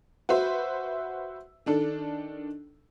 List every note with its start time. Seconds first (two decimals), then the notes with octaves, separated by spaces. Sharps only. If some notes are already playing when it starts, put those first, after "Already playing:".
0.29 F#4 B4 C5 E5
1.66 D#3 D4 A4